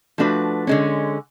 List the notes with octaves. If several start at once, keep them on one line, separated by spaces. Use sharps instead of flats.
F3 A3 D4 F#4 B4
D3 G#3 C#4